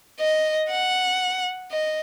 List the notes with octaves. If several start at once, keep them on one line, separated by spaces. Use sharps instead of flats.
D#5
F#5
D#5